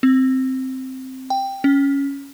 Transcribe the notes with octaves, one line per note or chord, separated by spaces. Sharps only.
C4
G5
C#4